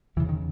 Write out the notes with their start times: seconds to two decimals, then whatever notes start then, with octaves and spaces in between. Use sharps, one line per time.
0.16 E2 C#3 E3
0.29 D#3